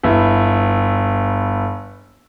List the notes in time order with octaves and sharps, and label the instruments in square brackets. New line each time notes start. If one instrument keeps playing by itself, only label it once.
[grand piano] G1 E4